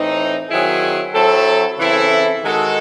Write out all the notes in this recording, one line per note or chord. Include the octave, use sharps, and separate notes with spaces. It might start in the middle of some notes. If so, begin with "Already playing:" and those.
Already playing: A2 E3 C4 D#4
D#3 F#3 C4 E4 G#4
F#3 C4 E4 A4
C#3 E3 C4 E4 A4
D#3 G#3 D#4 F#4 A4